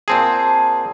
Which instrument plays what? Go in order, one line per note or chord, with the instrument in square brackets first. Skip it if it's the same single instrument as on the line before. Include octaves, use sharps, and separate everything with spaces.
[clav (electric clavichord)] A#2 C4 G#4 [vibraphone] A5